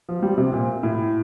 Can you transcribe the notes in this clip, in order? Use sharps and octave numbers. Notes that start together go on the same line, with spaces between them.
F3
F3
G3
C3
A#2
A2